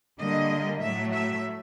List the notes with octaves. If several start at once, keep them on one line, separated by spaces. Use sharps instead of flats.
D3 G3 A#3 D#5
A2 F#3 A3 E5
E5